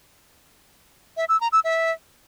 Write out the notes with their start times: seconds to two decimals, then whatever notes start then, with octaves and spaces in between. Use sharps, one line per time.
1.17 E5
1.29 E6
1.41 A#5
1.52 E6
1.64 E5